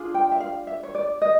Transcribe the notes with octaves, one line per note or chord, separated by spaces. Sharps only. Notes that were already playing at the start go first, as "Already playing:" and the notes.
Already playing: D4 F4 G#4
G5
E5
F5
E5
C#5
D5
D#5